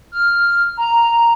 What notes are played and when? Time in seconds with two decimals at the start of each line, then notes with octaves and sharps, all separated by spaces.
0.12 F6
0.77 A#5